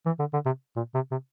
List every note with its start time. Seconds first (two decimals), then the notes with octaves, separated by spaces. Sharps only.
0.06 E3
0.19 D3
0.33 D3
0.46 C3
0.76 A#2
0.94 C3
1.11 C3